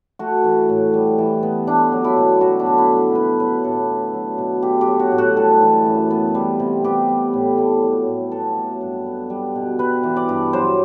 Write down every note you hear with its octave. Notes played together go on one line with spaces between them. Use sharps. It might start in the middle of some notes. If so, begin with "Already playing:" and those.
A3 F#4
E3
A2
G3
E3
B3
A3 D4
F#3
E4
B2
F#3 F#4
D4
D3
E4
G2
B3 B4
F#3 B4
A2 A4
B3
F#3
B2
A3 G4
G4
F#3
F#4
A2
F#4
G3 A4
E3
F#2
B3
G3
C3
B3 G4
G3
A2
A3
F#3
A2
B3 A4
F#3
G2
B3
G3
B2
G3 B4
E3
D5
G2
F#3 C5